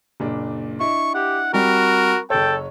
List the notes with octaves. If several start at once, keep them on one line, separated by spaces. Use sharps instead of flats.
F#1 A#2 D4
D4 E4 D#5 C#6
G4 F#5
G3 C4 F#4 A#4
F#1 A4 C#5 G5